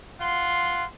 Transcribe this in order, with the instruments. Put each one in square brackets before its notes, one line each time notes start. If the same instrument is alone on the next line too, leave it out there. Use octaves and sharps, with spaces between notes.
[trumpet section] F4 F#5 C6